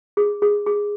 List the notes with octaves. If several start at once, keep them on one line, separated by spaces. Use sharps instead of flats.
G#4
G#4
G#4